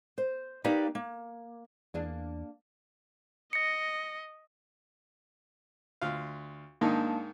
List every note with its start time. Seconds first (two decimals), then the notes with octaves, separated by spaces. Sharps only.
0.18 C5
0.64 A#3 D#4 G4 B4 D5 F5
0.95 A#3
1.94 E2 A#3 D4 G#4
3.53 D#5 A#6 C#7
6.01 D2 F4 F5
6.81 G#2 D#3 A#3 D4 D#4 A5